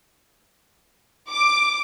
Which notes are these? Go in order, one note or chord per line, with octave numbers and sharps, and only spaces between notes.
D6